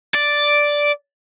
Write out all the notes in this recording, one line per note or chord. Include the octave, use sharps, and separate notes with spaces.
D5